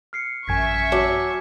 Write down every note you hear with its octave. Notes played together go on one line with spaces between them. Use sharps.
F6 C7 C#7
A1 F#2 E5 G#5 C#6 G#6 B6
F#3 A5 D6